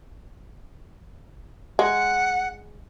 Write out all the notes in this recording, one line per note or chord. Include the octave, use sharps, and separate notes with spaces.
G#3 F#5